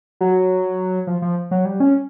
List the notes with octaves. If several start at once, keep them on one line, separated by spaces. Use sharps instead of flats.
F#3
F3
F3
F#3
G3
C#4